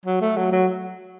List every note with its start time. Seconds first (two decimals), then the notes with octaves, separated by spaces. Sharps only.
0.05 F#3
0.21 A3
0.37 F#3
0.52 F#3